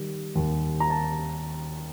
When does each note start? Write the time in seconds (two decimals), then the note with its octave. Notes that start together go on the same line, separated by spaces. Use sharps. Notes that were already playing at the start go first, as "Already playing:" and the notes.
Already playing: D#3 G3
0.35 D#2
0.80 A#5
0.90 A5